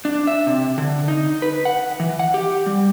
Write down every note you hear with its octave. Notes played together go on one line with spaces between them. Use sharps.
D4
E5
C3
D3
D#4
B4
F#5
E3
F#5
G4
G3